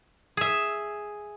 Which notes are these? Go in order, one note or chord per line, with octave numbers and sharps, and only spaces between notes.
G#4 E5